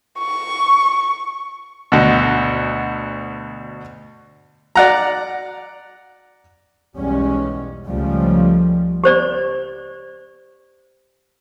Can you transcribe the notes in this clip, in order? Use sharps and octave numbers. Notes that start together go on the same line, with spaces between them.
C#6
D2 B2
D5 F#5 A#5
B1 E2 G3 G#3 C#4
C#2 C#3 F3 G3 A3
G4 C5 D5